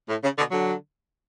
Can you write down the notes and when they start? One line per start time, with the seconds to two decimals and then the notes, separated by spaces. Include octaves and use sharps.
0.09 A2
0.23 C#3
0.37 B2 D3
0.51 D3 F#3